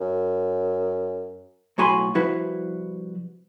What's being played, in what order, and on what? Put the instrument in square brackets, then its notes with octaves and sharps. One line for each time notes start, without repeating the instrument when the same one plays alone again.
[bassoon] F#2
[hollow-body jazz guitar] B1 A2 F#4 G#5 B5 C6
C2 F3 E4 F#4 B4 C5